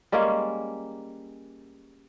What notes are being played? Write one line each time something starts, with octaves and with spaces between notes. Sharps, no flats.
G3 G#3 A#3 C#4